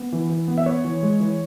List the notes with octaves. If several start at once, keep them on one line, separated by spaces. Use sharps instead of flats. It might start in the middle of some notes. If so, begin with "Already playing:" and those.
Already playing: B3
E3
E3
B3
E5
B3 C#5
E3
G#3
E3